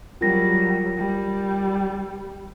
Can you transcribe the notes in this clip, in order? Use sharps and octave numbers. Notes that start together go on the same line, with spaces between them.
F#3 G3 F4 A#4 A#6
G3